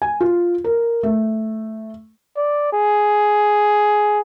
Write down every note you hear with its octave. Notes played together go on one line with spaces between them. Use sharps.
G#5
F4
A#4
A3
D5
G#4